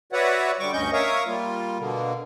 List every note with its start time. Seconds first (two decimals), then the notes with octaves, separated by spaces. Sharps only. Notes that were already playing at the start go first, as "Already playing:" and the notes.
0.13 F#4 B4 C#5 D5 E5 F#5
0.59 D3 G3 C#6 D6
0.73 D2 G2 C#4 D#5 C#6 G6
0.93 A#4 C#5 E5 F5 C#6 D#6
1.26 G3 A#3 F4
1.79 B2 D3 A#3